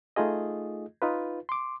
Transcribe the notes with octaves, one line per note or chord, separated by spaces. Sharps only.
A3 D#4 F4 G#4 D#5
D#4 F4 B4
C6 D6